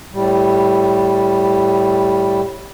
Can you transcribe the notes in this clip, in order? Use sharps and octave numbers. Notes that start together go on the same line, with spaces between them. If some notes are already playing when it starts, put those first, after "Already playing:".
A2 G3